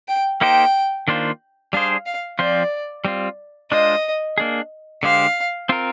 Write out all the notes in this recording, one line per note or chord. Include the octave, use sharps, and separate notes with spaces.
G5
A#3 D#4 G4 C5 G5
D#3 A#3 D4 F4 C5
G3 D4 G#4 C5 F5
F5
F3 C4 F4 C5 D5
G3 C4 F4
G#3 D4 F4 C5 D#5
A#3 D4 G#4
D3 G#3 D4 G4 C5 F5
C4 F4 A#4